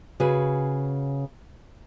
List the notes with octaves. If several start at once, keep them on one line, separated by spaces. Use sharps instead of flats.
C#3 F#4 G#4 B4